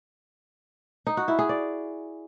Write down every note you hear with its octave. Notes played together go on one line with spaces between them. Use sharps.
D#4
F#4
E4
G#4
D5